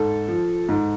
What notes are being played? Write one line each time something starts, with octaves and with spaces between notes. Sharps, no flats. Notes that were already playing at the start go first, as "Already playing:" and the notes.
Already playing: G#2 A4
F3
G#2